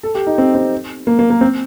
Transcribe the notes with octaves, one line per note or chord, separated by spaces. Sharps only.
A4
G4
D#4
C4
C4
A#3
A#3
A#3
C4